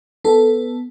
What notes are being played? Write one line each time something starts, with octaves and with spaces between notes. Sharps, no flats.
B3 A4